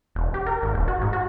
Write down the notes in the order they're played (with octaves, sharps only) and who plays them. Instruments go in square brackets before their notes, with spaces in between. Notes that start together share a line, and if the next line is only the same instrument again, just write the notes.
[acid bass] E1
G4
A#4
G#1
D#1
F#4
G#2
F#4